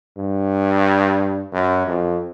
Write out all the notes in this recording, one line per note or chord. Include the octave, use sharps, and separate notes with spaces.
G2
F#2
F2